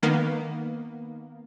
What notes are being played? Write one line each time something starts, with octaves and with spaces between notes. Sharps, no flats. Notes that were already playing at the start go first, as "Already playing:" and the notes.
D#3 A#3 B3